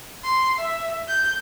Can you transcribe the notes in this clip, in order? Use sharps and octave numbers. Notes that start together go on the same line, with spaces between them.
C6
E5
G6